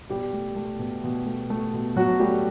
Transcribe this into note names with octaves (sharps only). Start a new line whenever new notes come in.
B2 G3 G4
A3
A3
B2
B2
A3
A3
B2
B2 F#3 F#4
G3 A3 G4